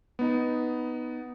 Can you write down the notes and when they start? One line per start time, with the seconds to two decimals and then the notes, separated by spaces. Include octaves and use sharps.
0.19 B3 D#4